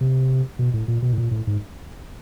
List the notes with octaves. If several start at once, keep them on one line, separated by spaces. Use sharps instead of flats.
C3
B2
A2
A#2
B2
A2
A#2
A2
G#2